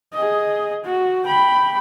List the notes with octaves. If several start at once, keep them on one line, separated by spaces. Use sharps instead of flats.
G#4 D#5
F#4
G5 B5